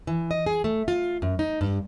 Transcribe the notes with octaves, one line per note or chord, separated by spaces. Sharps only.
E3
D#5
G#4
A3
F4
F#2
D#4
G2